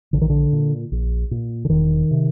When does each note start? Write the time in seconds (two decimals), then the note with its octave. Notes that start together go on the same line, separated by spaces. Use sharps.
0.13 A#1 D3
0.21 D#3
0.30 D3
0.53 A#2
0.92 A#1
1.31 A#2
1.65 D3
1.70 E1 D#3
2.11 C3